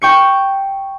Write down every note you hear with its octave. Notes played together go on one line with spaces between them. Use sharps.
G5 C#6 C#7